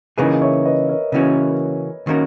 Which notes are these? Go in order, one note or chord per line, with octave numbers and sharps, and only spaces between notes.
C#3 E3 A#3 D#4 G#4 B4 D#5
C#5 E5
B4 D#5
A#4 C#5
C#3 E3 A#3 C#4 F#4
D#3 A#3 C#4 F#4 A#4